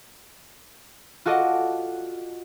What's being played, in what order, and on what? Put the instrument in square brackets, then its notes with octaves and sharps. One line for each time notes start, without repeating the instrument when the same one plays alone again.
[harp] F4 F#4 A4 D5 D#5